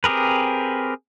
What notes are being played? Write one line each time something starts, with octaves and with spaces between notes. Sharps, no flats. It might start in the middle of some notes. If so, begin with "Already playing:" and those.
C4 G4 G#4 A#4 B4